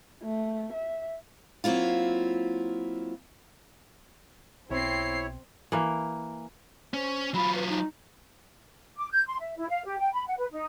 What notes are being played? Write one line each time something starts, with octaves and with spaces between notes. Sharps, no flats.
A3
E5
F#3 A#3 C4 E4 F4
B1 C4 E4 C#5 C7
E3 A#3
C#4 C5
F#3 F4 B5
B4
D#4
D6
G6
C6
E5
E4
F5
G4
G5
B5
F#5
B4
D#4